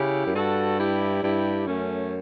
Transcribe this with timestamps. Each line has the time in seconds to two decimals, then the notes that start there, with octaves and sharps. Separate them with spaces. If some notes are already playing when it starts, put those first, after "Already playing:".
Already playing: C#3 E4 G4
0.26 F#2
0.35 G2 F#4 A4
0.79 E4 G4
1.23 G2 E4 G4
1.67 F#2 A3 C#4